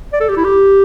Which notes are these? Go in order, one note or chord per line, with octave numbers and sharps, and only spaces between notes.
D5
A4
G4
E4
G4